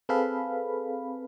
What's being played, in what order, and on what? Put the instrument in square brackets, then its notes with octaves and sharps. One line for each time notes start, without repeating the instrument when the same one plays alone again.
[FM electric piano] C4 G#4 A4 B4 F5 B5